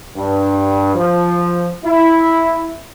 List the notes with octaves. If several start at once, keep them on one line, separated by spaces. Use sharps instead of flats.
G2
F3
E4